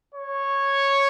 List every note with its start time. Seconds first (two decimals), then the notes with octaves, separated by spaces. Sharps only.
0.14 C#5